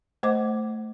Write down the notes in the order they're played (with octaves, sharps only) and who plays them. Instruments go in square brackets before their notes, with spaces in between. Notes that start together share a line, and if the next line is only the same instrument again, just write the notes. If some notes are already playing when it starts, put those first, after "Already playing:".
[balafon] A3 C5 D#5 F#5 D6